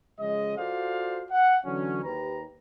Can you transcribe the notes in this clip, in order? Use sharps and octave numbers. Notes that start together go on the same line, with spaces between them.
C#3 F3 G#3 D#5
F4 F#4 A4 C5 D5 F5
F#5
D3 E3 F#3 C#4
D#2 G4 B4 A#5